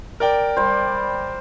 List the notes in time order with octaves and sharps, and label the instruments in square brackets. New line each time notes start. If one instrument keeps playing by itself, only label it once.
[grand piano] A#4 D5 G5
[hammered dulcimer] G3 C5